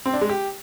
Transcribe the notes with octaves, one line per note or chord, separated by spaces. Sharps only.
C4
D4
G#3
G4